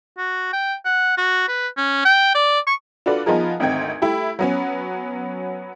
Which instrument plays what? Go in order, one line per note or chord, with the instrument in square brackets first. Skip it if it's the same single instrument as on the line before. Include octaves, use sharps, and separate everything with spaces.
[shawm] F#4
G5
F#5
F#4
B4
C#4
G5
D5
C#6
[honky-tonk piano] D4 F4 F#4 A4 B4 D5
F3 B3 D#4 F4 G#4 A#4
G#1 D2 C4 D#4 G5 G#6
A3 E4 G4
F#3 B3 C#4